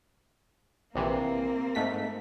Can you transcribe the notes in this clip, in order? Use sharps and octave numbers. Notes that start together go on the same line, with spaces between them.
A#1 C3 E3 A#3 C4
G#2 A3 B6